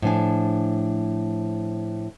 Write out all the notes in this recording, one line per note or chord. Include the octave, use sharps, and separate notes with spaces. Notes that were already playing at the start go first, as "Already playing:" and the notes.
A2 F3 D4 G#5